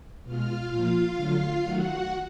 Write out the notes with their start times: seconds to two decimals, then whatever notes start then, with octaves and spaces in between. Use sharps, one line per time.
0.24 B2 G#3 F4 F5
0.70 A#2 F3 A#3 F4 F5
1.16 D3 F#3 A3
1.63 D#3 F#3 A3 F#4 F#5